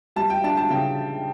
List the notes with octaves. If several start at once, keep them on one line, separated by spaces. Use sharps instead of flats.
G3 A5
G5
D4 A5
A5
C#3 G5